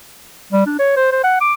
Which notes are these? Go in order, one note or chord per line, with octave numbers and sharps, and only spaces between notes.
G3
D4
C#5
C5
C5
F#5
D6